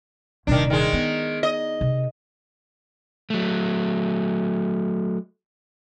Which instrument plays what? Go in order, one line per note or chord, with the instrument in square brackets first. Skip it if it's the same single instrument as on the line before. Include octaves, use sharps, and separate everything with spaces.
[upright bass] D#1 C3 [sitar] D#3 D4
[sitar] D#3 G#3
[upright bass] B3
[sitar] D#5
[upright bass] C3
[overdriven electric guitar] F#3 A3